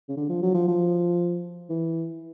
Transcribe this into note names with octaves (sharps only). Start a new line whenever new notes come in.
C#3
D3
F3
F#3
F3
F3
E3